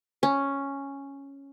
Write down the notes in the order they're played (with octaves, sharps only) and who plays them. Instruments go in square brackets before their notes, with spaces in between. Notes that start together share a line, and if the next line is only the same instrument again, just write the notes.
[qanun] C#4